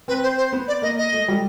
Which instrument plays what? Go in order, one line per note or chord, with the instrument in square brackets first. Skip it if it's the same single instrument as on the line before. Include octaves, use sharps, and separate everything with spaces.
[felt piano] C4 [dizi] B4
[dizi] C5
C5
[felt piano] B3
[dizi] D5
[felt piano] A#3 [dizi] D#5
[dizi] D#5
[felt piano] A3
G3